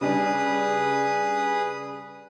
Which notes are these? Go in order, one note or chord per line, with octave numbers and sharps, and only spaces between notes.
C#3 G3 D4 G#4 B4 D#6